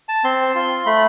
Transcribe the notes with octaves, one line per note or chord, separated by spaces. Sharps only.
A5
C4 C6
F4
A3 B5